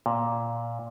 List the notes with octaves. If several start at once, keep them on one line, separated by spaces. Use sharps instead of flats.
A#2